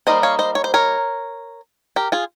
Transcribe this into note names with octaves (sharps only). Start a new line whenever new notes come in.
G3 A#3 D#4 C5 D#5
C#5 F5
C5 D#5
C#5
C5
A#4 C#5
G4 A#4
F4 G#4